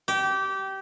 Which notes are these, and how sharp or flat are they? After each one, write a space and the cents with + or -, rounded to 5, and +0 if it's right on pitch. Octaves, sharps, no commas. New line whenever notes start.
G4 -20